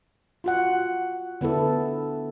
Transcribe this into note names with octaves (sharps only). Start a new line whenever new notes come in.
F4 F#4 F#5
D3 B3 E4 A4